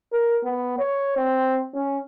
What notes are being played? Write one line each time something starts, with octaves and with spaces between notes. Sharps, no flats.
A#4
B3
C#5
C4
C#4